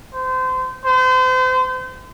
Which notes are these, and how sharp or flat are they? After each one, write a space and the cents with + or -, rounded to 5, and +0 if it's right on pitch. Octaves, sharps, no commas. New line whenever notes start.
C5 -30
C5 -35